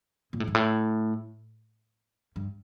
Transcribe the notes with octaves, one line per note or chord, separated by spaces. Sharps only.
A#2
A2
G#2
A2
G2